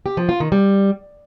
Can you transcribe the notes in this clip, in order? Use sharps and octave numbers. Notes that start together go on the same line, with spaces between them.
G4
F3
F4
D#3
G3